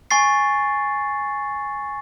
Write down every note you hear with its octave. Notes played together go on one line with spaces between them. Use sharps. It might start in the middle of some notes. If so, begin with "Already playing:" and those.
G#5 C#6 A6 C7